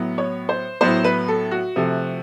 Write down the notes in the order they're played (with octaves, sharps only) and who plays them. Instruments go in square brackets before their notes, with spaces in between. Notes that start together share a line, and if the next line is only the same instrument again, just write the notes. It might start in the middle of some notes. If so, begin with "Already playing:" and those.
Already playing: [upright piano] A2 F#3 B3
C#5
C5
A2 F#3 B3 C5
B4
A4
F#4
C3 F3 A3